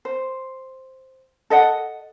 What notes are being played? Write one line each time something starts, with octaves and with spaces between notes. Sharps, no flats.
C5
A4 D#5 F#5